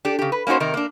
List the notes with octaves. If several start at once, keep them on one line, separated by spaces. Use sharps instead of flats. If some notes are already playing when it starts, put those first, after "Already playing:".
D4 G4 A4
C#3 G4
B4
A#3 C#4 D#4 F#4 C5
C3 D#3 D#4 A#4
A#3 D4